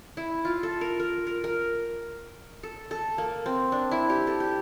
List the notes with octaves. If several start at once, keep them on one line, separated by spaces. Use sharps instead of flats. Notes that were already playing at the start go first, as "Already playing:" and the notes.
E4
F4
A4
A#4
A#4
A#4
A#4
A4
A4
A#3
C4
D4
E4
G4
A4
G4